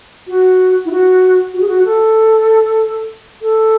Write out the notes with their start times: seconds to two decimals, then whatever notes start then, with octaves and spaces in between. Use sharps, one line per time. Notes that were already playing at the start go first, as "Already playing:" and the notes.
0.28 F#4
0.85 E4
0.91 F#4
1.54 F#4
1.61 G#4
1.68 F#4
1.85 A4
3.42 A4